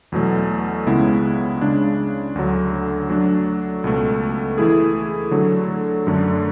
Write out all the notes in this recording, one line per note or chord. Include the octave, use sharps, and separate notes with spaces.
E2 B2 F#3 A3
C#2 C#3 G#3 B3 E4
C#3 G#3 D4
D2 D3 F#3
F#3 A3 D4
C#2 B2 A3
E3 A3 E4 G#4
D3 F#3 A3
F#2 D3 A3 D4